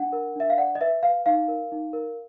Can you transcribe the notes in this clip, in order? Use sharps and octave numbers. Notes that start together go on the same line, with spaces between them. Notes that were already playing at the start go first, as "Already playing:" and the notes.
Already playing: D4 F#5
A#4
D4 E5
F5
D5 F#5
D#5
B4 E5
B4 F5
D#4 F5
A#4
D#4
A#4